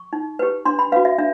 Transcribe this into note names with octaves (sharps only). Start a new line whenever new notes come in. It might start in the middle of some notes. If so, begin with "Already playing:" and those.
Already playing: C#6
D#4
G4 B4
D4 C6
B5
F#4 B4 F5
E5
D4 E5